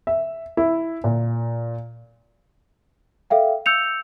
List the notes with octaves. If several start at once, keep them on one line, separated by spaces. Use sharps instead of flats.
E5
E4
A#2
A4 E5 F5 G5
E6 G6 C#7 F7